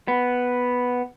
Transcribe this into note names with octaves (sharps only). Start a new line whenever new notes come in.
B3